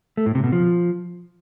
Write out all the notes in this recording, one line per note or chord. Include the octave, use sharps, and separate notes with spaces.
A3
A2
C3
B2
F3